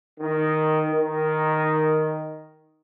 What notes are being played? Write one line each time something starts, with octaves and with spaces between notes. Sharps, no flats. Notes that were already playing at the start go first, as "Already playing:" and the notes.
D#3
D#3